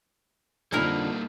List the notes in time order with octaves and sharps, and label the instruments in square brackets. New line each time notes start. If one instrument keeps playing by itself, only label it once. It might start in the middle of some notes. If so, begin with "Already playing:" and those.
[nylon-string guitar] F2 D3 [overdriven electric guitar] G3 A#3 [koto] D#4 E4 A#4